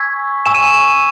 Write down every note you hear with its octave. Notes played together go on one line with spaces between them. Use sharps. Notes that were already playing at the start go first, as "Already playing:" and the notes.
Already playing: G#5 C#6 E6 G#6 B6
G#5 C#6 E6 E7
D#7